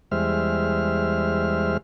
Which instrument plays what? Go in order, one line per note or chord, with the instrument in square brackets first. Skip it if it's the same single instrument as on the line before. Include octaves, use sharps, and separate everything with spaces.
[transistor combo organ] E2 G3 G#3 C5 E5 F6